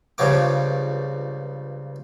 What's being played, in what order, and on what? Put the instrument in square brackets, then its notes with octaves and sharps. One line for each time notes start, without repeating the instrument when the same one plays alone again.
[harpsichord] C#2 G2 C#3 F3 C#5 D6